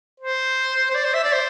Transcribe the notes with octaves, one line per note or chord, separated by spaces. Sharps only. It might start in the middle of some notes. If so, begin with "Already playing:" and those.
C5
C5
D5
C5
E5
D5
C5